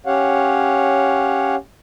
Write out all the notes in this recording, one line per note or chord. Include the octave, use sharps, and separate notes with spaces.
C#4 G4 C#5 F5 F#5